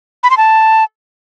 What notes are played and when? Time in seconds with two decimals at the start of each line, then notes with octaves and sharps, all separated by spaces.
0.23 B5
0.30 C6
0.37 A5